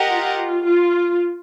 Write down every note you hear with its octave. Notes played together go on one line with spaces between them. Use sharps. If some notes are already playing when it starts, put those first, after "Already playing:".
Already playing: G4 A#4 D#5 F#5
F4
F4